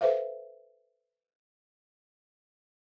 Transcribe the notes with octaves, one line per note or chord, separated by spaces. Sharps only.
A4 B4 C5 E5 F5